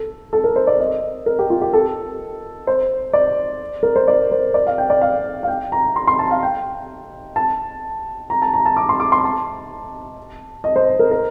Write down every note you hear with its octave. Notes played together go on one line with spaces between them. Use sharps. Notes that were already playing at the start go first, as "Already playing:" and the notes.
Already playing: A4
A4
A#4
C5
D5
D#5
A#4
G4
F4
G4
A4
C5
D5
A#4
C5
D5
C5
D5
F5
G5
D5
F5
F5
G5
A#5
C6
C6
A5
F5
G5
A5
A#5
A5
A#5
A5
D6
C6
D6
C6
A5
D#5
C5
A#4
A#4